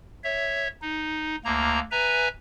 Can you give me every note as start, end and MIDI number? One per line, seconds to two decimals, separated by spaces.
0.24 0.68 73
0.24 0.68 76
0.82 1.36 63
1.45 1.80 38
1.45 1.80 58
1.45 1.80 82
1.91 2.28 71
1.91 2.28 76
1.91 2.28 80
1.91 2.28 82